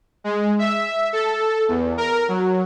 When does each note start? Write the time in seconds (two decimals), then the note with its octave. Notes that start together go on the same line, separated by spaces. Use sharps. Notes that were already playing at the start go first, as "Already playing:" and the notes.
0.24 G#3
0.59 E5
1.13 A4
1.68 E2
1.97 A#4
2.28 F#3